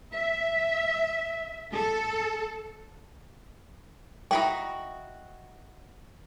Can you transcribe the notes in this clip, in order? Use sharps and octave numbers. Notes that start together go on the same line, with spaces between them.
E5
A4
D#4 E4 F#4 G5